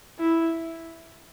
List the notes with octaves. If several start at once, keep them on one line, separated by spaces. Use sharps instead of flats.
E4